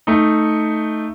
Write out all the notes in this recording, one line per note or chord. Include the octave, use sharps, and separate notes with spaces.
A3 D#4